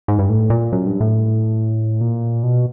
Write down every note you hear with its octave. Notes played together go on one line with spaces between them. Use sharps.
G#2
G2
A2
A#2
F#2
G2
A2
A#2
B2